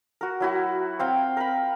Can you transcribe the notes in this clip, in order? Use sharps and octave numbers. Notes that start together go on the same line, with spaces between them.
F#4 A#4
F#3 E4 F#4
C4 F5 G5
A#4 B5